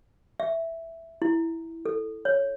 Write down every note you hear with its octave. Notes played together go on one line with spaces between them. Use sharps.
E5
E4
A4
C#5